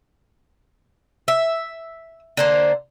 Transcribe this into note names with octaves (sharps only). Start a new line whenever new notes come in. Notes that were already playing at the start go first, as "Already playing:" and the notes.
E5
D3 A#3 C5